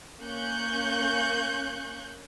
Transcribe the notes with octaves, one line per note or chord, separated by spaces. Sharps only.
A#3 C#4 C#6 F#6 G6